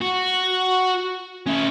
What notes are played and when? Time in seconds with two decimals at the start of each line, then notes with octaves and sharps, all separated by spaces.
0.02 F#4
1.46 C#4 E4